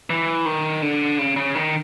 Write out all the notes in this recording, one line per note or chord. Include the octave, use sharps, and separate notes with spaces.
E3
D#3
D3
C#3
C#3
D#3